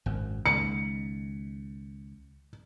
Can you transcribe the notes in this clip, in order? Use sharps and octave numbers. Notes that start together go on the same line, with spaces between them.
G#1 F#2
C#2 D#3 C#7